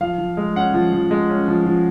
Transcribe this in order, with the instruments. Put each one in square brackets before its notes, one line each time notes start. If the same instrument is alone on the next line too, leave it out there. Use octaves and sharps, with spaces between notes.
[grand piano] F3 F5
F3
G#3
C#4 F#5
F3
F3
G#3
C#4
F3
F3